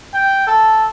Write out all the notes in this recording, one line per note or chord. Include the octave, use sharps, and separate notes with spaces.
G5
A4